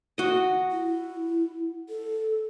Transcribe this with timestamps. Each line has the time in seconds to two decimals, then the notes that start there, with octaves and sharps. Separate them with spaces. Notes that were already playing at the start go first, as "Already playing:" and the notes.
0.18 F#4 D#5
0.71 E4
1.89 A4